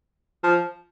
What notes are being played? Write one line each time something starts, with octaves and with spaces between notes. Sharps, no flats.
F3